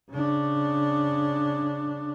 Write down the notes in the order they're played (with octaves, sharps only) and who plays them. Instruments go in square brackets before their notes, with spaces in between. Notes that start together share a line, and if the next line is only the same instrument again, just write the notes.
[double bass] C#3 D4